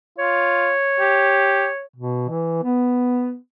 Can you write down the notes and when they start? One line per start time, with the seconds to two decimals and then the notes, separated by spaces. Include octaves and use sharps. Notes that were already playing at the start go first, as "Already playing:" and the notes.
0.18 F4 C#5
1.00 G4
1.96 B2
2.29 E3
2.63 B3